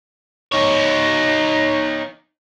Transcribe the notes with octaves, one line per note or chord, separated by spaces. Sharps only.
D#4 C#5